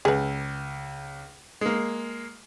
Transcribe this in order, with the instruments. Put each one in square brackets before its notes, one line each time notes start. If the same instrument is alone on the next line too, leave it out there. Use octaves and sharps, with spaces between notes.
[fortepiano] C#2 [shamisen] G#4 B4
[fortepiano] G#3 A#3